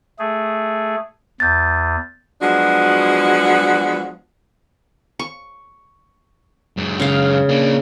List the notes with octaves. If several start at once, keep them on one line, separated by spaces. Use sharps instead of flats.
A3 G#4
E2 G6 A6
F3 F#3 G#3 B3 D4 F#4
C#6
F#2 G#3
C#3 F5
A#3 D4